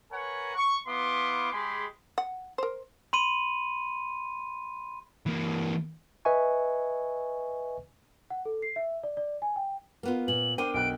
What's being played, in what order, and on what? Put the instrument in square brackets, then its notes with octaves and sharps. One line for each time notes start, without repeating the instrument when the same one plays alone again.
[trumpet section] A#4 B4 C#5 F#5 G#5
C#6
B3 E4 B4 F5 C6 D6
G#3 G4 G#4 B5 C6
[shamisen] F#5
A#4 C5
[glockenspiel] B5 C6 D#7
[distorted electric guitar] E3 A#3
[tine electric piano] B4 D#5 E5 G#5 C#6
[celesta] F#5
A4
C7
E5
D5
D5
G#5
G5
[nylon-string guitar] A#3 B3 F4
[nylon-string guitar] A#2 [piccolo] F#7
[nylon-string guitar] D4 A#4 C5 [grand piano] G5 D6 [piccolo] D#7
[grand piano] B1 G5 F#6 [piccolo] D7